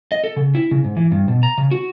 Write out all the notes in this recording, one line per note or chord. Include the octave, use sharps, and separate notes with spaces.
D#5
A4
C#3
E4
C#3
G#2
E3
G2
B2
A#5
C#3
F#4